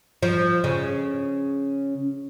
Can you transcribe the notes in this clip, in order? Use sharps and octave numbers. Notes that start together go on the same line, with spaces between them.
F3
C#3